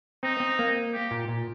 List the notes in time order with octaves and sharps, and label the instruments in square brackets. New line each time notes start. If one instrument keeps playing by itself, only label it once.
[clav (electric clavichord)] C4 [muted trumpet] D#4
[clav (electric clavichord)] C4
A#3
[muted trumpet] G4
[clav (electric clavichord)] A#2
A#2